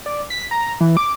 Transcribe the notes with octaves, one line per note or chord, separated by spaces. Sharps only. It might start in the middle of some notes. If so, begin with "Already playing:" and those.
D5
B6
A#5
E3
D6